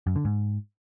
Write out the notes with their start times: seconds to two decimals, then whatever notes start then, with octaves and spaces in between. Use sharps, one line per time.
0.07 F#2
0.16 D3
0.25 G#2